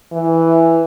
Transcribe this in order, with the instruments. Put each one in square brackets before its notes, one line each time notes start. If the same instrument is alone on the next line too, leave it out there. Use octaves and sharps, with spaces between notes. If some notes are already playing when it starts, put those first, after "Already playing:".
[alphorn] E3